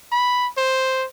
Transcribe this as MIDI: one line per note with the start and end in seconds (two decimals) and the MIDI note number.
0.12 0.48 83
0.57 1.06 72